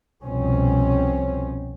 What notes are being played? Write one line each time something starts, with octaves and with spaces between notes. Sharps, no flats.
C2 F2 B2 C4 C#4